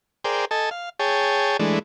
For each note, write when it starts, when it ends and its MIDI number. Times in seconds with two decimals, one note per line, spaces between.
0.24 0.45 68
0.24 0.45 70
0.24 0.45 72
0.24 0.45 74
0.24 0.45 79
0.51 0.70 69
0.51 0.70 75
0.51 0.70 80
0.51 0.70 81
0.71 0.89 77
1.00 1.57 68
1.00 1.57 73
1.00 1.57 79
1.00 1.57 81
1.60 1.79 52
1.60 1.79 56
1.60 1.79 57
1.60 1.79 62